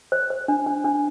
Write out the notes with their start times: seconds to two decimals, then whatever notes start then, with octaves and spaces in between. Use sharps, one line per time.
0.12 C5
0.30 C5
0.48 D4
0.66 D4
0.84 D4